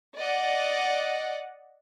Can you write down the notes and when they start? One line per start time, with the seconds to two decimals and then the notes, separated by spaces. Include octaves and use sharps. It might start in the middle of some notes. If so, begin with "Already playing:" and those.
0.16 D5 D#5 F#5